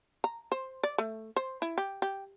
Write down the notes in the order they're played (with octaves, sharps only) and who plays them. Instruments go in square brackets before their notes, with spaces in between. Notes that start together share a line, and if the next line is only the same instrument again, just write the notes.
[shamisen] A#5
C5
D5
A3
C5
E4
G4
G4